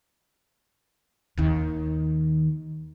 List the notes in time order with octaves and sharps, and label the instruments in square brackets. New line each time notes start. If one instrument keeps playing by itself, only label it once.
[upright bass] D#2 D#3